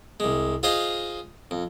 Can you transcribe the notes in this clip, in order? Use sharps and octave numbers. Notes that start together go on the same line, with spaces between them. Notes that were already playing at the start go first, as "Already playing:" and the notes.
C2 G#3
F4 G#4 C5 D#5 F5 G#5
F2